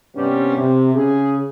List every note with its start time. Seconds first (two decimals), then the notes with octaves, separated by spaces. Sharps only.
0.15 G2 C3 G3 B3 C#4
0.57 C3
0.94 C#3 G#4